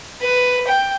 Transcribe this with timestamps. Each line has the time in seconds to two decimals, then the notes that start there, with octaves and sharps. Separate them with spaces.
0.21 B4
0.67 G5